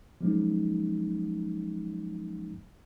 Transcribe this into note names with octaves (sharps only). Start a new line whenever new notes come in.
F3 F#3 G#3 A#3 C#4 D#4